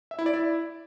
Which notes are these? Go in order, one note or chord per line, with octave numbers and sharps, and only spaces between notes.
E5
E4
D5
E4